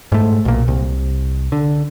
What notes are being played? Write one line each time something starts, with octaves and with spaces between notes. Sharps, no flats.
G#2 A3
B1 A#2
C2
D3